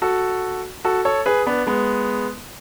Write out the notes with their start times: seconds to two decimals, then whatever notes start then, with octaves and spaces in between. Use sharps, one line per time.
0.02 F#4 A4
0.85 F#4 A4
1.05 A4 C#5
1.26 G#4 B4
1.46 B3 D4
1.67 G#3 B3